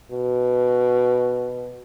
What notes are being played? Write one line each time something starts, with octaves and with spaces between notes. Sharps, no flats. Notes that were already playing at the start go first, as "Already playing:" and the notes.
B2